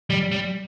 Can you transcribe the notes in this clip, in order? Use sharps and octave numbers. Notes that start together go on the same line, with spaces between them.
G3
G3